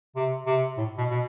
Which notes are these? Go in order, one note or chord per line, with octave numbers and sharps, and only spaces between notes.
C3
C3
A2
B2
B2